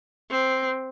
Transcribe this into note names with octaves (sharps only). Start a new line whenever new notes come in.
C4